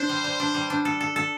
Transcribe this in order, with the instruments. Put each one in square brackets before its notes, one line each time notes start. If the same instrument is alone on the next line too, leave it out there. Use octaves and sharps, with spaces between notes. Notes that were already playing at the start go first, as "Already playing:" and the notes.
Already playing: [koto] D4 [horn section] C5
[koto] G3
G3
D4
G3
D4
A4
A4
A4